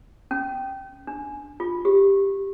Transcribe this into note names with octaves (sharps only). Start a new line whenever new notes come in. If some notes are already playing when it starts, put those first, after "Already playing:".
C#4
D4
F4
G4